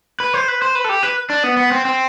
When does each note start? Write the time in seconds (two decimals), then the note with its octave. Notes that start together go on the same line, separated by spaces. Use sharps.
0.20 B4
0.34 C5
0.48 B4
0.62 C5
0.75 B4
0.84 A4
0.89 G4
1.03 B4
1.30 D4
1.43 B3
1.57 B3
1.72 C4
1.85 C4